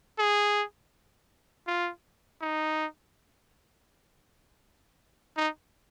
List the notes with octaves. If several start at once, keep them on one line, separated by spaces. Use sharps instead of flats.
G#4
F4
D#4
D#4